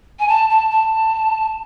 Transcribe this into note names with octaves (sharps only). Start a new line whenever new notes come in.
G#5
A5
A5
A5